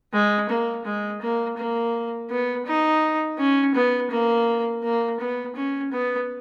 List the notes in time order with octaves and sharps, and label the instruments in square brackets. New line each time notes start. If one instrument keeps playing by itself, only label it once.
[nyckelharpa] G#3
A#3
G#3
A#3
A#3
B3
D#4
C#4
B3
A#3
A#3
B3
C#4
B3